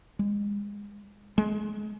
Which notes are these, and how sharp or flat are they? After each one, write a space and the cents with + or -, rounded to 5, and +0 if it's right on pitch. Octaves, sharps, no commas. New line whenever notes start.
G#3 -25
G#3 +20